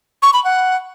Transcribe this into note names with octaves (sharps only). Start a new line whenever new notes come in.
C#6
B5
F#5